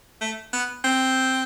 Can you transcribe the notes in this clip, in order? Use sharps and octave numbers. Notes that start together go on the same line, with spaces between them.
A3
B3
C4